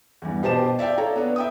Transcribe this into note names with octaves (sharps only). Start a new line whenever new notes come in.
E2 G2
B2 G4 C5 D#5 A5 E7
D5 E5 F5 G5
A4 C#5 D5 A#5
B3 D4
E5 G5 D#6